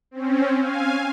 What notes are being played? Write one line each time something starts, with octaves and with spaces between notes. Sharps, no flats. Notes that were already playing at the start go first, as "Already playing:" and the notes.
C4 C#4
F5 G#5